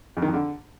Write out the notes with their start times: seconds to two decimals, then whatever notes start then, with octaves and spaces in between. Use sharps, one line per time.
0.17 F2
0.22 D#3
0.28 F2
0.34 D3